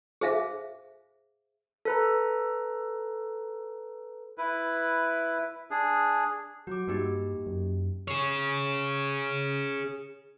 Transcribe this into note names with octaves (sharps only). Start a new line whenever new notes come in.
G#4 C5 E5 F5
A4 B4 A#5
E4 B4
D4 G#4
F#3 F#4 D6
G2 A#3 D#4 G4
F#2
G#4 C#5